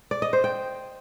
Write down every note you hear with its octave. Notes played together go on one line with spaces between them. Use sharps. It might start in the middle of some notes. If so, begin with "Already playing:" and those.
D5
D#5
C5
G5